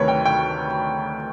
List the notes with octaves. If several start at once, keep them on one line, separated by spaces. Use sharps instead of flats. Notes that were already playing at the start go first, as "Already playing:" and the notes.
Already playing: D2 C3 D#3 F#3 A3 A#4 B4 C#5
G5
G5